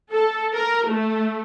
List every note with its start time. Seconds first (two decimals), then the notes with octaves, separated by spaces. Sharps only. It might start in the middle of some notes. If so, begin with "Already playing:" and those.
0.10 A4
0.53 A#4
0.87 A3